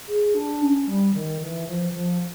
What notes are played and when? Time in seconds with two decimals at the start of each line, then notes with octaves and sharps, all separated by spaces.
0.08 G#4
0.34 D4
0.62 C#4
0.87 G3
1.14 D#3
1.41 E3
1.67 F3
1.90 E3
1.94 F3